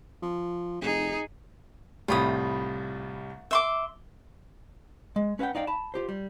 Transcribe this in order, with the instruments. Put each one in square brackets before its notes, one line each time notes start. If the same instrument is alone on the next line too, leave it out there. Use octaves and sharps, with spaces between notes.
[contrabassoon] F3
[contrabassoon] F1 [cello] D#4 G#4
[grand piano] C2 A2 G3 [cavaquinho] F4 B5 D#6
[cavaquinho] E5 C6 D6
[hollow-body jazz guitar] G#3
C#4 B4 E5 F#5 G5
D#4 D5 F5 G5
A5 B5
F4 G4 C5
G3